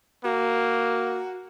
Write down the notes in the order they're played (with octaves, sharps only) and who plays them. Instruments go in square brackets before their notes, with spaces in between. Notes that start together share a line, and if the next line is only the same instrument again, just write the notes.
[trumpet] A#3 [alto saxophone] F#4